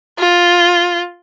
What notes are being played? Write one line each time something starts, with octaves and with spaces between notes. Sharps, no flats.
F4